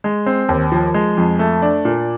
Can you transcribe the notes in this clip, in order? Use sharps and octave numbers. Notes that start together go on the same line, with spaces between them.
G#3
C4
D#2
F3
G#3
F2
A3
D4
A#2